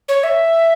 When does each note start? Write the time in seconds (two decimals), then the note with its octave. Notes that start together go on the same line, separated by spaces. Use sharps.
0.08 C#5
0.23 E5